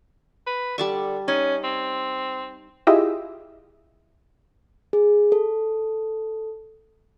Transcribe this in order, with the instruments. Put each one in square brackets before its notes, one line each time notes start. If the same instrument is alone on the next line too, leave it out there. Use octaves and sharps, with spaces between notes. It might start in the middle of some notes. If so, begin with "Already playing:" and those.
[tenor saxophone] B4
[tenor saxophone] D3 [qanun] G3 A5 C#6
[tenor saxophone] C#4 [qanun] D#4
[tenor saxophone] C4
[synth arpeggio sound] E4 F4 G4 G#4 D#5 E5
[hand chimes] G#4
A4